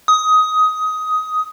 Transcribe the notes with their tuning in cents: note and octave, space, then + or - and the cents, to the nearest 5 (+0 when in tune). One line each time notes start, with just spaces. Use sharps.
D#6 +15